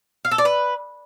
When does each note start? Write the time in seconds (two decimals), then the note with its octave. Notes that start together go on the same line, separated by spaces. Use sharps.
0.25 F5
0.31 A4
0.38 D5
0.45 B4